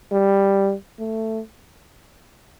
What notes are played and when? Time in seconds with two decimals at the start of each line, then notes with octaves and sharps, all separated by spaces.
0.12 G3
0.99 A3